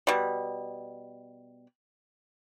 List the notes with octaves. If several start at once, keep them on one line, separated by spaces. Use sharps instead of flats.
B2 G3